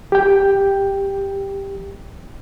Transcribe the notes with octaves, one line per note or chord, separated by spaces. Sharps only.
G4 G5